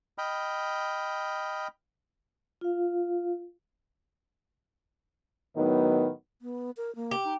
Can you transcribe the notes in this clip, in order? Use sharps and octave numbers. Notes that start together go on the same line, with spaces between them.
D#5 G5 B5 F6
F4 F5
A2 D#3 F#3 B3 D#4
B3
A#4
A#3
G4
D#4